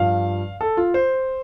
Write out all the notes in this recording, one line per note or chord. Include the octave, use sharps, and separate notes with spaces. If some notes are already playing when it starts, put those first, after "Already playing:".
Already playing: G2 F3 F5
A4
F4
C5